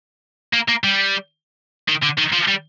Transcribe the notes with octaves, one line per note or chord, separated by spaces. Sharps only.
A#3
A#3
G3
D#3
D3
D#3
F3
G3